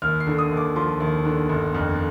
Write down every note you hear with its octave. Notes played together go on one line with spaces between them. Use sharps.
D#2 F6
C7
D3
D#6
D#2
D6
F3 C6
D#2
D3
G1
F2